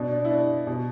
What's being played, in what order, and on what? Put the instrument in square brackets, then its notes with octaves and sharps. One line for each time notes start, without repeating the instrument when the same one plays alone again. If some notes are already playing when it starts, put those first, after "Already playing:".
Already playing: [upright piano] B2 D4
D4
E4
D4
B2